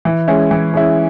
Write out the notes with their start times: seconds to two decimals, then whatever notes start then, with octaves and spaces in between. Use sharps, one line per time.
0.05 E3
0.28 G#3 C#4 E4
0.51 E3
0.74 G#3 C#4 E4